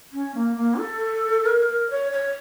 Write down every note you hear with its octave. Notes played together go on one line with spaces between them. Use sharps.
C#4
A#3
A#3
A4
A#4
A#4
C#5
C#5